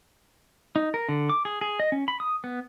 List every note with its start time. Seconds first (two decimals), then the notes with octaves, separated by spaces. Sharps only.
0.76 D#4
0.94 A#4
1.09 D3
1.29 D6
1.45 G#4
1.61 G#4
1.80 D#5
1.92 C#4
2.08 B5
2.20 D#6
2.44 B3